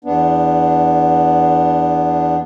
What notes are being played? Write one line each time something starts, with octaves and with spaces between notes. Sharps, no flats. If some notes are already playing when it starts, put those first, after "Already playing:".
E2 B3 D4